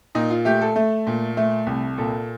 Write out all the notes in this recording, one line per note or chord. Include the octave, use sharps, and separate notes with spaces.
A#2 D#4
F4
A3 G4
A4
A3
A#2
A3
C2
A#2 A4